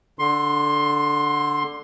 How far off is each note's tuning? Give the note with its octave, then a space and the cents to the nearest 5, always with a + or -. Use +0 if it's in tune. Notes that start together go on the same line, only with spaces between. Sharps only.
D3 +0 C6 +15